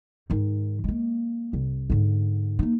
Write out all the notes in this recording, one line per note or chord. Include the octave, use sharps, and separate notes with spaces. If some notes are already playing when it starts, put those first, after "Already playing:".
G#2 D#3
G#3 A#3
C2
G#2 D3
A#3 D#4